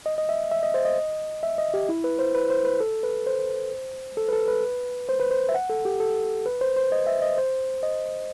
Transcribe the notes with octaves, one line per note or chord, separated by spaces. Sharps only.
D#5
D#5
E5
E5
D#5
C5
D#5
E5
D#5
G4
E4
B4
C5
B4
C5
B4
A4
B4
C5
A4
B4
A4
B4
C5
B4
C5
E5
F#5
A4
G4
A4
B4
C5
C5
D#5
E5
D#5
C5
D#5